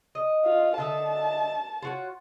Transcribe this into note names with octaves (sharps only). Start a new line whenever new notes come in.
D#5
F4
D3 D#5 E5 A5
F4 F#4 C#5